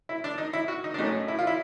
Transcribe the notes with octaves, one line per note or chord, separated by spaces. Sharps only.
E4
D4
D#4
E4
F#4
D#4
D4
A2 F#3 A3 C#4 D#4
E4
F4
E4